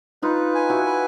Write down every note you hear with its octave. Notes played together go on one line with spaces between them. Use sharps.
D#4 F4 B4
G#5
E4 F#4
B4